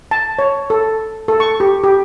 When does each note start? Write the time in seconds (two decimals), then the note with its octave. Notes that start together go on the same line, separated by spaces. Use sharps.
0.11 A5
0.39 C#5
0.70 A4
1.28 A4
1.40 C#6
1.60 G4
1.84 G4